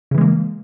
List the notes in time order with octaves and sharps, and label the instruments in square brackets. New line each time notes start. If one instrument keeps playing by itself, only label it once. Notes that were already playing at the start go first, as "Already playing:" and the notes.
[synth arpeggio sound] C#3
E3
G#3
A#3